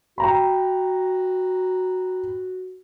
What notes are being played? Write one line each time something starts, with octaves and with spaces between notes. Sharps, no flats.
F#4 G5 A#5 B5